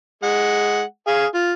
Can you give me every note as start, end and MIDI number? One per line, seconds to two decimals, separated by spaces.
0.23 0.82 56
0.23 0.82 78
1.07 1.26 68
1.07 1.26 77
1.35 1.53 65